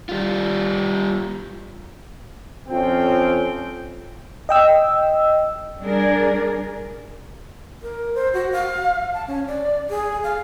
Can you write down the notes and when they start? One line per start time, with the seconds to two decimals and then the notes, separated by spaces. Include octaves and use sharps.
0.09 G3 F4
2.69 F2 F3 C4 C#4 F4 G5
4.49 D#5 G5 E6
5.81 G3 D4 G#4 A#4 D5
7.83 A#4
8.15 C5
8.34 F#4
8.52 F5
9.14 A5
9.27 C#4
9.47 D5
9.90 G#4
10.24 F5